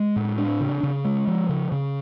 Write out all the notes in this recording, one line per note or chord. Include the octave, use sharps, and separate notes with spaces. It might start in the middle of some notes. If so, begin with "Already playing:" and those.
Already playing: G#3
A2
D4
C#3
C#3
G#3
F3
C#3
C#3